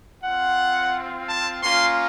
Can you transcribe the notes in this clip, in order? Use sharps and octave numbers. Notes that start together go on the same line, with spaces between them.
C4 F4 F#5
A5
A#3 C#4 F4 C6